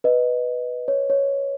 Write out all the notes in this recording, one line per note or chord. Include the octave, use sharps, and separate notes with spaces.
B4 D#5
C#5
C#5